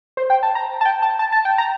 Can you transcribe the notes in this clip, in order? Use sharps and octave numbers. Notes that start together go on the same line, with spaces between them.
C5
G5
A5
A#5
A5
G5
A5
A5
A5
G5
A#5